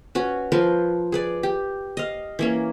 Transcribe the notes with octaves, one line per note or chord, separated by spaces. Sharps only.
C#4 F#4 B4
F3 A#4 B4 C6
G#4 B4 D5
G4
D#5 F5
E3 A#3 C#4